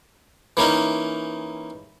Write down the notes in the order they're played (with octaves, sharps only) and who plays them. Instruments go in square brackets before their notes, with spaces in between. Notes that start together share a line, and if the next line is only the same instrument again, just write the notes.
[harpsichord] E3 A#3 C#4 D#4